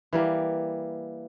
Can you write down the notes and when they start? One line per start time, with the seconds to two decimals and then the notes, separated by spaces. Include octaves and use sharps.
0.13 E3 G3 A#3